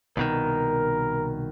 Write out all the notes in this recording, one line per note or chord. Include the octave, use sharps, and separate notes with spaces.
C2 B2 D#3 A#4